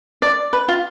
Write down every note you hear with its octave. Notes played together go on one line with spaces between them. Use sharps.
D5
B4
F4